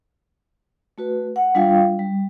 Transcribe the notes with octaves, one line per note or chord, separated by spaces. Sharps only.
A3 F#4 B4
F#5
G3 D4 F4 F5 G5
G3